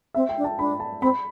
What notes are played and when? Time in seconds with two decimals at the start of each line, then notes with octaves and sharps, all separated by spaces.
0.14 C4 E5
0.29 G5
0.37 D4
0.44 A5
0.59 D4 B5
0.80 A5
1.01 C4 B5